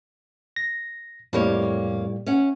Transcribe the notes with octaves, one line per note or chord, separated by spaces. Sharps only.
A#6
F2 A2 G3 A#3 C#5
C#4 F#5